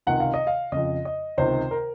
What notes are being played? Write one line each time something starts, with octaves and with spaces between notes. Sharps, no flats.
C#2 C3 D#3 F#5
F5
D#5
F5
F2 C#3 D#5
D#5
C#2 C3 D#3 C5
A#4